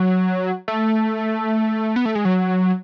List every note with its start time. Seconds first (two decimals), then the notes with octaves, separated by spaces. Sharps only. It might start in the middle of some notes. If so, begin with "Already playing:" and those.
Already playing: F#3
0.68 A3
1.96 B3
2.05 A3
2.15 G#3
2.25 F#3